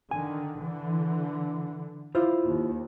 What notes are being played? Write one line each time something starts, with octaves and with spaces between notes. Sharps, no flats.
D3 D#3 G#5
D3 E3
E4 F4 C5
D#2